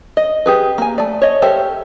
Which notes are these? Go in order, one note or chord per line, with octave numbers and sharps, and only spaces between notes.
D#5
G4 G#4 B4
A#3 G#5
A3 D5
C#5 D#5
G4 A4 A#4 C5 E5